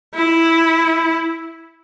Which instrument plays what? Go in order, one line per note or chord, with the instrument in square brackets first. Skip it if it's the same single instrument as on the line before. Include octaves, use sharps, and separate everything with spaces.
[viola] E4